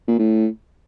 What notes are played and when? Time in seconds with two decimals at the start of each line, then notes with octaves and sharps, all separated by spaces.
0.08 A#2
0.19 A2